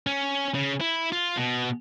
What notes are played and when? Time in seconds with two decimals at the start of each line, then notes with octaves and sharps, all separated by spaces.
0.07 C#4
0.55 C#3
0.81 E4
1.12 F4
1.37 B2